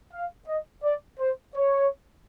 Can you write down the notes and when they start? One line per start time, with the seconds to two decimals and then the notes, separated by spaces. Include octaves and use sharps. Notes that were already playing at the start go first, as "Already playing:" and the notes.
0.13 F5
0.48 D#5
0.83 D5
1.19 C5
1.55 C#5